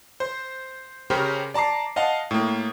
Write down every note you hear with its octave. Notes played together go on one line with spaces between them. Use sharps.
C5
C#3 C#4 G4 A#4 C5
D5 A5 A#5 D6 C7
D#5 F5 F#5 A5
A2 A#3